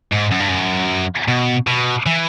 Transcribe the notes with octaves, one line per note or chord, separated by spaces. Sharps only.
G#2
F#2
G2
F#2
B2
B2
E3